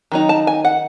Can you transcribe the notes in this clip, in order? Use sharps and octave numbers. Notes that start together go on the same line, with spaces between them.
D#3 F#3 D#4
A5
G#5
F#5